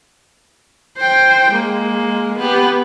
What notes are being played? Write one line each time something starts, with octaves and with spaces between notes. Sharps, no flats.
C5 G5
G#3 A#3
B3 G4